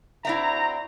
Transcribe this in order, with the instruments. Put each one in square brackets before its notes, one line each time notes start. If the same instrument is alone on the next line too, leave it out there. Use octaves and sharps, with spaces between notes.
[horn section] C4 F#4 A#5 [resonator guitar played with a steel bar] E4 D5 E5